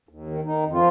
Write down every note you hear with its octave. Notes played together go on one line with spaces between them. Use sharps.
D#2
D#3
D#3 D#4
F2
F3 F4